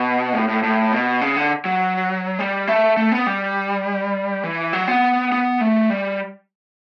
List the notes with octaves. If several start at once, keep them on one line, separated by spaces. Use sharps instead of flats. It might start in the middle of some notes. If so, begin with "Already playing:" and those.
Already playing: B2
A2
A2
A2
B2
C#3
D3
F#3
G3
A3
A3
B3
G3
E3
F#3
B3
B3
A3
G3